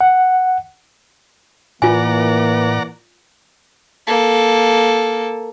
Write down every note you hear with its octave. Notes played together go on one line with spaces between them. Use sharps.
F#5
A2 E3 A#3 F4 D5 F#5 G#5 A#5
A#3 A4